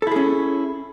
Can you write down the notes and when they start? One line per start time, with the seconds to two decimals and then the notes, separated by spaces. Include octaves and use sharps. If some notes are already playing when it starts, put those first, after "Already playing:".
0.02 A4
0.07 E4
0.11 G#4
0.16 C#4